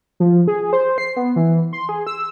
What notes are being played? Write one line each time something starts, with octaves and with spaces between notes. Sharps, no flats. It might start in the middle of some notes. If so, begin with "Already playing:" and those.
F3
G#4
C5
C7
B3
E3
C6
G#4
E6